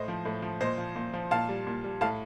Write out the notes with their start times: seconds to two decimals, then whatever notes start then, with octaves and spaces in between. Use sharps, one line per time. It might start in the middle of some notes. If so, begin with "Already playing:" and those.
Already playing: A2 C5 D#5
0.08 F3
0.25 A2
0.42 F3
0.60 A#2 C5 D#5
0.78 F3
0.95 A#2
1.13 F3
1.31 A#2 F5 A5
1.49 G3
1.67 A#2
1.84 G3
2.01 A2 F5 A5